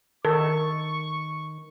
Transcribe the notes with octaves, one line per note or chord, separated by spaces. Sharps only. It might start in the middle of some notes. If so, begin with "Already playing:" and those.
D#3 A4 A#4 C#6